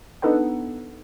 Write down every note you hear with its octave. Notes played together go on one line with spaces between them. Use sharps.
B3 D4 D#4 A4 B4 F#5